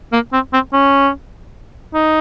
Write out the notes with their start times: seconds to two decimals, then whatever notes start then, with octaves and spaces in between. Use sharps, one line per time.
0.13 A#3
0.33 C4
0.53 C4
0.73 C#4
1.94 D#4